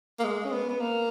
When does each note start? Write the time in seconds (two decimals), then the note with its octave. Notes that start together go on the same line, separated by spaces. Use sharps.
0.19 A#3
0.24 G#3
0.45 C#4
0.52 B3
0.69 B3
0.80 A#3